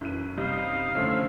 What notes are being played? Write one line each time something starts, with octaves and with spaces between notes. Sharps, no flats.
B1 F#2 E3 D#7
C3 G3 D#4 F5 G6
C#2 D3 F3 A3 C#4 E4